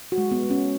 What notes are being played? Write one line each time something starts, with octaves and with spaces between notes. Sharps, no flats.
F#4
G#3
B3
G#3
C#4